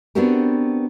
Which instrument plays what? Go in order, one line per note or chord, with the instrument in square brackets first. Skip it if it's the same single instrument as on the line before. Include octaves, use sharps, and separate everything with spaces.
[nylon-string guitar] B3 C4 D4 F#4 G4 A#4